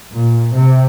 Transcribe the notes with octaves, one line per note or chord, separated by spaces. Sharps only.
A#2
C3